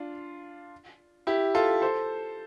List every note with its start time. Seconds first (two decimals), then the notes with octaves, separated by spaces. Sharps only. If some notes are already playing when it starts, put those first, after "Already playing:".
Already playing: D4 F4
1.27 E4 G4
1.55 F4 A4
1.82 A4 C5